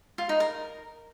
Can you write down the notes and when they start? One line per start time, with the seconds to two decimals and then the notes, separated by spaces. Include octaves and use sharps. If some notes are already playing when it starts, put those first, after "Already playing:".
0.18 F4
0.29 D#4
0.40 A#4